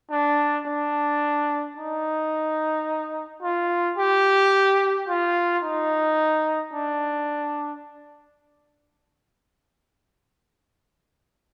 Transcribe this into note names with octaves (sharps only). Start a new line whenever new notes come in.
D4
D4
D#4
F4
G4
F4
D#4
D4